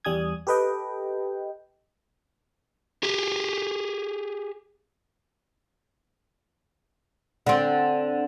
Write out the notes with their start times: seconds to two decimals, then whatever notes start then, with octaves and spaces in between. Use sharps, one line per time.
0.05 E2 G3 G#5 D#6 G#6
0.47 G4 A4 B4 D#5 G5
3.03 G4 G#4
7.46 D3 C4